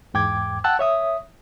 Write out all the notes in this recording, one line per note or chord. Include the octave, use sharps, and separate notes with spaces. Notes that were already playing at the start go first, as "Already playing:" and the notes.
E2 G#2 G5 D6 G#6
F#5 G5 A5 E6 F#6
C#5 E5 D#6